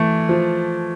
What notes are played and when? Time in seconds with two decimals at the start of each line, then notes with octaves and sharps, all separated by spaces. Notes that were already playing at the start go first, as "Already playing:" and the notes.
Already playing: E3 A3
0.29 F3